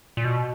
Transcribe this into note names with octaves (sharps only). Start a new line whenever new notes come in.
A#2
B2